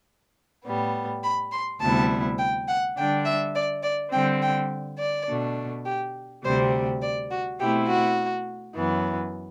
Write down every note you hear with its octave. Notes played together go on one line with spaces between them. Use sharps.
A2 G3 B3
B5
C6
D2 C3 G3 B3 E4 A5
G5
F#5
D3 G3 D4 G5
E5
D5
D5
D3 G3 C4 G5
G5
D5
B2 A3 D4
G4
D2 C3 G3 C4 C5
D5
F#4
B2 A3 C4 E4 G4
F#4
F#2 E3 B3